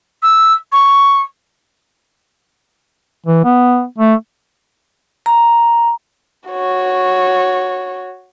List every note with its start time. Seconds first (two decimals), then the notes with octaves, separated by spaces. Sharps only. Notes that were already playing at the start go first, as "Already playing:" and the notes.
0.23 E6
0.72 C#6
3.26 E3
3.45 B3
3.98 A3
5.26 A#5
6.49 F#4 C#5